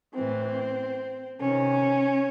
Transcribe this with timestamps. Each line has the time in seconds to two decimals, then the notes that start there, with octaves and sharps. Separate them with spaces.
0.15 A2 E3 C4
1.41 C3 D#3 C#4